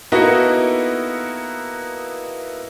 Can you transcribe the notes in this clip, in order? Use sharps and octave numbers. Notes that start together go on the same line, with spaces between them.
A#3 B3 D#4 E4 F#4 A4